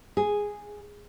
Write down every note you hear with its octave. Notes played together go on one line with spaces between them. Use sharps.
G#4